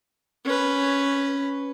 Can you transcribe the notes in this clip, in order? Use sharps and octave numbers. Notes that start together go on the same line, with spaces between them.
C#4 B4